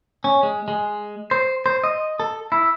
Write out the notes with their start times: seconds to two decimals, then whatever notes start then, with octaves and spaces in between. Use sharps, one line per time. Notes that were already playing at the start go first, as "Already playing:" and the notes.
0.24 C#4
0.43 G#3
0.68 G#3
1.31 C5
1.66 C5
1.84 D#5
2.20 A4
2.52 E4